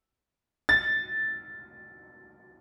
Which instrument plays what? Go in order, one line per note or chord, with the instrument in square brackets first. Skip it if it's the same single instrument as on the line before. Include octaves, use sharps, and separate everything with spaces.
[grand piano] A6